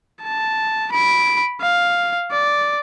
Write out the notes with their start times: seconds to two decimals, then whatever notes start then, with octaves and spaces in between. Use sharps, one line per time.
0.23 A5
0.92 B5 D7
1.61 F5
2.32 D5